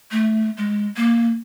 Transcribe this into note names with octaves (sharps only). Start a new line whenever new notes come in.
A3
G#3
A#3